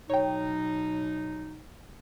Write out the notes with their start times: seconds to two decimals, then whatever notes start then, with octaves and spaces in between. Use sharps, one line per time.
0.10 B2 F#3 D#4 C#5 G5